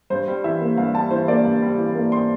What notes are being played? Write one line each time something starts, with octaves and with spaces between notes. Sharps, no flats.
G2 C5
G3
E3 E5
A#3
G2 F5
G3 A5
E3 C5
A#3 D5
G2
G3
E3
A#3
C6